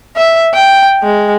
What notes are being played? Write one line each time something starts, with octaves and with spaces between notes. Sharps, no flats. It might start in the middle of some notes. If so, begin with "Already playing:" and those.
E5
G5
G#3